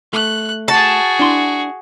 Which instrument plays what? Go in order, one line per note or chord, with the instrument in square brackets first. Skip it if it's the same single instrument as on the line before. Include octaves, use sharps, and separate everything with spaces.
[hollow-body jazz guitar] A3 [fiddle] F#6
[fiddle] F#4 G#4 [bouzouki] A5
[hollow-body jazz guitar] D4 E4 C6